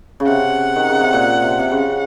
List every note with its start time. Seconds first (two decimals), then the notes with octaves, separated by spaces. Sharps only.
0.20 C#3
0.28 C3 F#5
0.76 D#3
0.88 C#3
1.01 C3
1.13 A#2
1.42 C3
1.59 C3
1.71 C#3